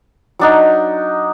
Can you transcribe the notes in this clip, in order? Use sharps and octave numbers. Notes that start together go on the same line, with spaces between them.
F#3 D4 D#4